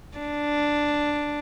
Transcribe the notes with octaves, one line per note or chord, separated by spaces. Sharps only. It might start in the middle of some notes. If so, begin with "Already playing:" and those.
D4